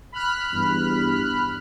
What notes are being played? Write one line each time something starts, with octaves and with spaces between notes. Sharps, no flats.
B5 F6 F#6
E2 G2